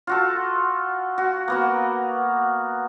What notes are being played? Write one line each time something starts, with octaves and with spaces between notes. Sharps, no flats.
F4 F#4 A4
F#4
A#3 B3 F#4